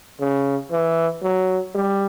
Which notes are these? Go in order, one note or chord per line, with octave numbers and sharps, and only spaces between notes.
C#3
E3
F#3
G3